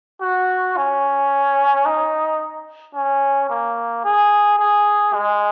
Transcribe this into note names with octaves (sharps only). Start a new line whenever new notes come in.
F#4
C#4
D#4
C#4
A#3
G#4
G#4
G#3